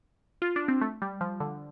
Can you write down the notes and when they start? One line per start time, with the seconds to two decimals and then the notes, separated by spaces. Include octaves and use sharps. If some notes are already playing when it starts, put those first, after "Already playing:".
0.42 F4
0.56 D4
0.68 C4
0.81 A3
1.02 G3
1.21 F3
1.40 D3